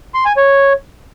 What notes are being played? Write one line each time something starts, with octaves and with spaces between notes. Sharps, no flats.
C6
G#5
C#5